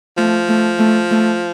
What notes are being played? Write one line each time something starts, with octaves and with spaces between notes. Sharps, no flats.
F3 A3
A3
A3
A3